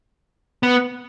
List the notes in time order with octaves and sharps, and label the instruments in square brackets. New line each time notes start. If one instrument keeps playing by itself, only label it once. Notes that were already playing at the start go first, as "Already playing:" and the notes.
[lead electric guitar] B3